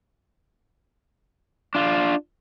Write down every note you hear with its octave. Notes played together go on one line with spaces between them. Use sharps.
D4 F4